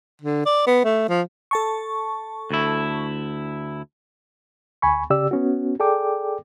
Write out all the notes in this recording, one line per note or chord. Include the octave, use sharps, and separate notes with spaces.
D3
D5
B3
A3
F3
A4 A5 C#6
D2 E4
D2 G#5 B5 C#6
C#3 G4 D5 E6
B3 C#4 F#4
G#4 A4 D5 G5 D6